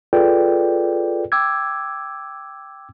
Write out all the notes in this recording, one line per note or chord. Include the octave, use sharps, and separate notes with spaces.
F4 G#4 A4 B4 D5 G5
G5 D6 E6 G#6